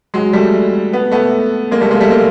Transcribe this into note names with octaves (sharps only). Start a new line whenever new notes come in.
F#3 G#3
G3 A3
B3
A3 B3
G#3 A#3
G3 A3
G#3 A#3
G3 A3
G#3 A#3